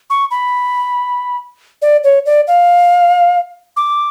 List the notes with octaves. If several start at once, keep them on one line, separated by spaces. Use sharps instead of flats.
C#6
B5
D5
C#5
D5
F5
D6